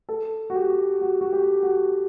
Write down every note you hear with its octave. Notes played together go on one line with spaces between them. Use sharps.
A4
F#4
G4
F#4
F#4
G4
F#4